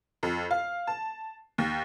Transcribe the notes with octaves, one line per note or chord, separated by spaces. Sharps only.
F2
F5
A5
D#2